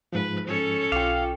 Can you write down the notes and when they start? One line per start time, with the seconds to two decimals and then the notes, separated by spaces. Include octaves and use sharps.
0.13 G#2 F3 B4
0.46 C#4 A4 C#5
0.92 B1 F4 F5 G5 D6